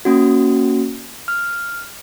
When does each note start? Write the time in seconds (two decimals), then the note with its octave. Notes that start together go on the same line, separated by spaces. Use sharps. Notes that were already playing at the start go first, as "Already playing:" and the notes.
0.05 A#3 C#4 F#4
1.28 F6